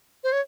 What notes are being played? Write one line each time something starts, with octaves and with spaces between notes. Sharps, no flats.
C5
C#5